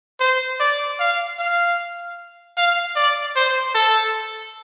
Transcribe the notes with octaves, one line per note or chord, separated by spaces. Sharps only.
C5
D5
F5
F5
F5
D5
C5
A4